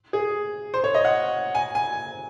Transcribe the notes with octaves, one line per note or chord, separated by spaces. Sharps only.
G#4
C5
C#5
D#5
F#5
G#5
G#5